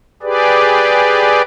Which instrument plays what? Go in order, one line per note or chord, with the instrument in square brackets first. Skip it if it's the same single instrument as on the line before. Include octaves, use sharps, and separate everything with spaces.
[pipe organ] G4 G#4 B4 D5